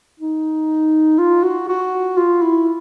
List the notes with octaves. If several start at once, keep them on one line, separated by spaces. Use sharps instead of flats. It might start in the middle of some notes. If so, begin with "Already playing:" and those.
D#4
F4
F#4
F#4
F4
E4